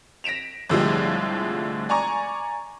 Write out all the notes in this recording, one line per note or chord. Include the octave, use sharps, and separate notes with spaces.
A#6 B6 D7 E7 F7
C2 A2 D3 F3 G3 G#3
D5 G#5 A#5 C#6